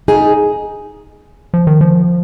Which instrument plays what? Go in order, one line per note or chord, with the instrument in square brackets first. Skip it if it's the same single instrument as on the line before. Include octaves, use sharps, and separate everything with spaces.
[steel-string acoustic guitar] D#4 G#4
[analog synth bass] F3
D#3
F3